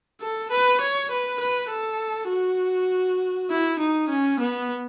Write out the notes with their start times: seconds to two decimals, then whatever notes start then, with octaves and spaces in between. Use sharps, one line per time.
0.21 A4
0.51 B4
0.81 C#5
1.11 B4
1.40 B4
1.70 A4
2.30 F#4
3.50 E4
3.80 D#4
4.10 C#4
4.40 B3